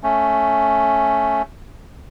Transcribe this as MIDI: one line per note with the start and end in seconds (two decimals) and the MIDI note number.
0.03 1.42 57
0.03 1.42 61